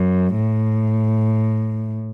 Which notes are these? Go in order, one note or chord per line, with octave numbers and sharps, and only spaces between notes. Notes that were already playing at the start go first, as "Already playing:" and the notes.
Already playing: F#2
A2